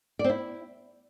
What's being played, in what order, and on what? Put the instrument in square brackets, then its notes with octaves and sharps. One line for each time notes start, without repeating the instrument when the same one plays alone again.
[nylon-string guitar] D5
C4
E4